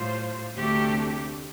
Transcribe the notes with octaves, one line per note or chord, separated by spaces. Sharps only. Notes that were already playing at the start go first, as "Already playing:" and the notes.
Already playing: A2 G3 F4 C5
D2 C3 A3 D4 G4